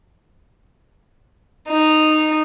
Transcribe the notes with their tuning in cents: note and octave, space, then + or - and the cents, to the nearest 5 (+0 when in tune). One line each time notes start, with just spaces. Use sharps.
D#4 -10